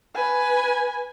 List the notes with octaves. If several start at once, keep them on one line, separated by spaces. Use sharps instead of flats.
B4 G#5